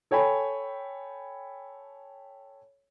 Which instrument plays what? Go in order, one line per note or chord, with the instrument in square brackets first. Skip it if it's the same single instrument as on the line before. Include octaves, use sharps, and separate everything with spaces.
[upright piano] A4 C#5 G5 G#5 B5